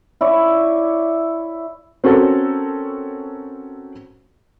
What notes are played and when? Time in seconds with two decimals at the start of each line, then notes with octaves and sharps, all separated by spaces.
0.21 E4 C#5 D5
2.04 C4 C#4 F#4 A4 A#4 C#5